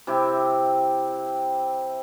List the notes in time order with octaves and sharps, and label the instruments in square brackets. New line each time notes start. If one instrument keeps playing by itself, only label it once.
[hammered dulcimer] C3 E4 G4